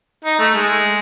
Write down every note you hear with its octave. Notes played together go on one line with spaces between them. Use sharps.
D#4
A3
G#3